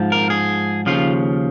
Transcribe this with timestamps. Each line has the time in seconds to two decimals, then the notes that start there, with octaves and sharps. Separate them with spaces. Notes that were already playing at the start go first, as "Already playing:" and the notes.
Already playing: G#2 F3
0.12 A#4
0.30 G#4
0.86 D#2 C#3 F3 F4